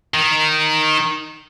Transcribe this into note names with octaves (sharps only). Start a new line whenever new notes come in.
D#3